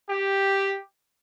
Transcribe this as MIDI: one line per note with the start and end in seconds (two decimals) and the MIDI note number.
0.10 0.77 67